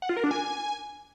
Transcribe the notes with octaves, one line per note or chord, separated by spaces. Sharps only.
F#5
F4
A#4
D4
G#5